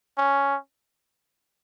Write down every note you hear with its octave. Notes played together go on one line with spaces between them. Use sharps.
C#4